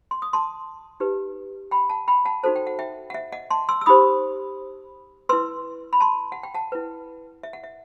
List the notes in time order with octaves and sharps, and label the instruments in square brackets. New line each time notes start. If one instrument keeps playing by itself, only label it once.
[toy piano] C6
D#6
A5 C6
D#4 G4 B4
G5 B5
F#5 A5
G5 B5
F#5 A5
D#4 F#4 A4 C5 A5
G5
F#5
E5 G5
F#5
E5
D#5 F#5
A5 C6
C6 E6
E6
D#4 G4 C5 B5 D#6
E4 B4 C6 E6
B5
A5 C6
F#5
G5
F#5 A5
E4 B4
E5
F#5
E5